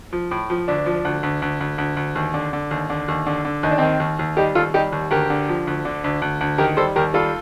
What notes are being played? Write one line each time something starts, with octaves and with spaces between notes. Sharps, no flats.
F3
A2
F3
D2 D4
F3
D2
D2
D2
D2
D2
D2
D#2
D3
D3
D#2
D3
D#2
D3
D3
D#2 D#4
D4
D#3 C4 D#4
D#2
D#2
G3 D#4 G4
D#2 F4 A4
G3 D#4 G4
D#2
D2 G4 A#4
D3
F3
D2
D3
D2
D2
D2
D#3 G4 A#4
G3 A4 C5
D#2 G4 A#4
G3 F4 A4